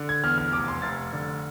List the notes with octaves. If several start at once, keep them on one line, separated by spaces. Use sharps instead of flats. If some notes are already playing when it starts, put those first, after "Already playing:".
Already playing: D3
G#6
E2 F6
F6
F1 D6
C6
F1 A6
D3